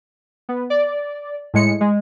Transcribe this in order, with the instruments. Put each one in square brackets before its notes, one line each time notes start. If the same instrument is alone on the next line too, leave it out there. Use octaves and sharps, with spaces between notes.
[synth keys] B3
D5
A2 G#3 C#7
G#3